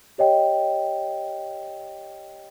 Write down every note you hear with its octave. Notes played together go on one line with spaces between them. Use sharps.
G4 C#5 D#5 G5